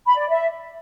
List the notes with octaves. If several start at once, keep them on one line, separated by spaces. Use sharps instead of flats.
B5
D5
E5